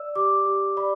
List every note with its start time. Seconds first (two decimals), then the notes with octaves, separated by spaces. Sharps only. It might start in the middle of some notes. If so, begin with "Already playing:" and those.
Already playing: D5 E6
0.16 G4 D6
0.46 G4
0.77 D5 B5